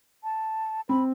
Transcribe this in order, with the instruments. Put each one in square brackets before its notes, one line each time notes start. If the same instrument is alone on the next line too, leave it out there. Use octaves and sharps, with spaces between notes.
[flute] A5
[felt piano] C4 [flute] B5